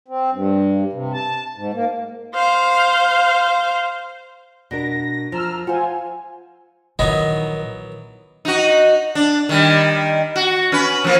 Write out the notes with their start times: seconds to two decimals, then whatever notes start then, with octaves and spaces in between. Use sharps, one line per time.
0.08 C4
0.32 G2
0.93 C3
1.13 A5
1.56 G#2
1.74 A#3
2.35 C5 F5
4.71 B2 D4 A#4 A#6
5.32 F3 A#5 E6 F6
5.67 F4 C5 F#5 G#5
6.99 A#1 D#3 E3 F#3 B3 D#5
8.45 D#4 F#4
9.15 D4
9.49 D#3 G3
10.36 F#4
10.72 C#4 B4
11.04 F3 A#3